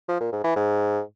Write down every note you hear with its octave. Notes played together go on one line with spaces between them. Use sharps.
F3
A#2
G#2
E3
G#2